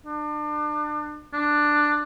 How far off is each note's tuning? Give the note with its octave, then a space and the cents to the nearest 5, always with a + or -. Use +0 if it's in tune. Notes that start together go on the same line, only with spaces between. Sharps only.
D4 +35
D4 +10